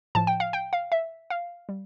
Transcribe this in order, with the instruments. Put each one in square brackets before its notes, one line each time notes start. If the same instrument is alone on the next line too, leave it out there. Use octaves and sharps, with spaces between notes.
[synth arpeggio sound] A2 F3 A5
G5
F5
G5
F5
E5
F5
G3